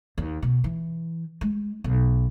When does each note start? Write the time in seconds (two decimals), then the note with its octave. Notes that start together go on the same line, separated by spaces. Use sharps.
0.18 D#2
0.42 B2
0.64 E3
1.41 G#3
1.84 B1